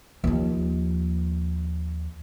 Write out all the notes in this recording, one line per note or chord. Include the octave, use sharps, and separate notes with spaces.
D#2 F3